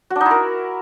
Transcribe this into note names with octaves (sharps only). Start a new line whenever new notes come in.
F#4
D4
D#4
E4
A#4